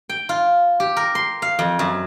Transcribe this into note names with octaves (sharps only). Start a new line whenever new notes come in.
G5
F4
G4
A#4
C6
F5
F2
F#2